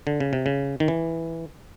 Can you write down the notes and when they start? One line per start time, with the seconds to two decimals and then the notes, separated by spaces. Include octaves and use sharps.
0.07 D3
0.20 C#3
0.33 C3
0.46 C#3
0.80 D#3
0.88 E3